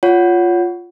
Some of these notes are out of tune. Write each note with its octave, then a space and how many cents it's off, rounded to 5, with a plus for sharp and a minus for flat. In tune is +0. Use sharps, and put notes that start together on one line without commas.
F4 +0 C#5 +25 F#5 +0